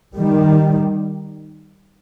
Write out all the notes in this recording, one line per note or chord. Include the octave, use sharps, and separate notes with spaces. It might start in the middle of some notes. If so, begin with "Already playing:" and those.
D#3 G3